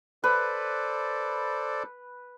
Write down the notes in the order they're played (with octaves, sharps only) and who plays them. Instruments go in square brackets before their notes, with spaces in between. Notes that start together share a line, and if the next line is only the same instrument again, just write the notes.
[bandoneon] A4 C5 D5 [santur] B4